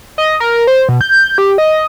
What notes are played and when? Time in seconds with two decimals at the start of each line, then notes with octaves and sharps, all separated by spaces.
0.18 D#5
0.40 A#4
0.67 C5
0.89 B2
1.01 G6
1.38 G4
1.58 D#5